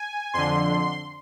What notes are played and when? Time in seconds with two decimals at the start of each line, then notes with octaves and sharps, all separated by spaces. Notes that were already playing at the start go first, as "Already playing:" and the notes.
Already playing: G#5
0.33 F2 D3 C6